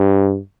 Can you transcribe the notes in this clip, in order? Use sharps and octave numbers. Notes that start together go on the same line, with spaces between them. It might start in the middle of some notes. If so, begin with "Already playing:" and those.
Already playing: G2